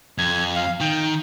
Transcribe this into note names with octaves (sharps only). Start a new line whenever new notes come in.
F2 G#6
F5
D#3 G5